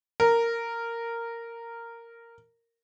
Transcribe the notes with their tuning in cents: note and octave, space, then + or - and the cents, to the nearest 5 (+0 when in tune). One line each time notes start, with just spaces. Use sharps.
A#4 -10